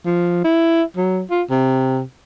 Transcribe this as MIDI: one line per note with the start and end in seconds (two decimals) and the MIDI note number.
0.06 0.43 53
0.44 0.82 64
0.97 1.21 54
1.31 1.43 65
1.50 2.01 48